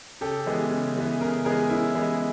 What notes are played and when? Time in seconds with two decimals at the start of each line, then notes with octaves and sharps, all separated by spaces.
0.21 C#3 G4 A4
0.46 E3 G#3 B3
0.71 C#3
0.96 E3 G#3 B3
1.20 C#3 G#4 A#4
1.45 E3 G#3 B3 G#4 A#4
1.70 C#3 E4
1.95 E3 G#3 B3